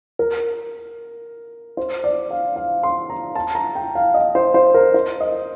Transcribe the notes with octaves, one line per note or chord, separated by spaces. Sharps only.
A#4
C5
D5
F5
F5
C6
A#5
A5
A#5
G5
F5
D#5
C5
C5
A#4
C5
D#5